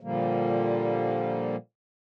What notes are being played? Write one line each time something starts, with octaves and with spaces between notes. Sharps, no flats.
A#2 D3 F3 G3 A#3